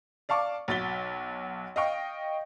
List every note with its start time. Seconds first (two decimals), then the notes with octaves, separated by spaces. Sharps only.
0.29 D5 F5 A5 C#6 D6
0.68 B1 F#4 A6 B6 G7
1.76 D#5 F5 G5 C#6